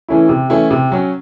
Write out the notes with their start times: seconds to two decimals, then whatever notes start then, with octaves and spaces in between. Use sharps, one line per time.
0.09 E3 A3 C#4 E4
0.29 C3
0.50 E3 A3 C#4 E4
0.71 C3
0.92 F#3 C#4